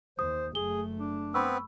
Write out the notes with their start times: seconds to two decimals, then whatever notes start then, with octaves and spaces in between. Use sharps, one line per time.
0.19 D#2 C5 D#6
0.55 F#1 A3 G#4 G7
0.99 D4
1.34 B3 C4 B4 B5 C#6 E6